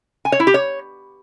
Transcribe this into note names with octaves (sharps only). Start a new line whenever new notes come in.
G#5
C#5
E4
G4
C#5